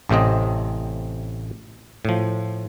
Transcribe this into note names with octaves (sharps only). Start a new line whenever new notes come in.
A1 A2 C3 C4 D#5
A2 F3